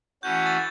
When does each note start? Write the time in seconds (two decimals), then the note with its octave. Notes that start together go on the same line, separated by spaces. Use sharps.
0.23 E3 A3 C#4 F#4 G6
0.34 G#6
0.47 A6